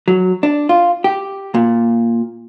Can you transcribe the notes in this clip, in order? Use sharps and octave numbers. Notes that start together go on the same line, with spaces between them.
F#3
D4
F4
G4
A#2